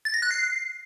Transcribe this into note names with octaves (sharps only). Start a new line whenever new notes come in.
A6
A#6
F#6
C7